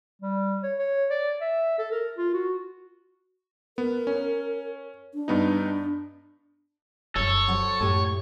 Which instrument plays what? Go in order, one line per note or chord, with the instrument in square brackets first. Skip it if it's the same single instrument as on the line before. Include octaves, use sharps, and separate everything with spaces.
[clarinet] G3
C#5
C#5
D5
E5
A4
A#4
F4
F#4
[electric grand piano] B3 [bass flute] A#4
[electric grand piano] C#4
[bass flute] D4
[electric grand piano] G2 B3 D#4
[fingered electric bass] F1 F#2 [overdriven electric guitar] A4 [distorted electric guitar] C#5
[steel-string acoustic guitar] F#3 C5 F#5
[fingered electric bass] F#2 [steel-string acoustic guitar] A2 G4